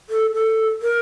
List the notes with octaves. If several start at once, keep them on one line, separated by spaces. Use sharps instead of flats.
A4
A4
A#4